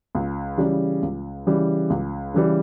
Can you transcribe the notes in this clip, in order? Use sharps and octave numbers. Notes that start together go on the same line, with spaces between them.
C#2
C#3 E3 G3
C#2
C#3 E3 G3
C#2
C#3 E3 G3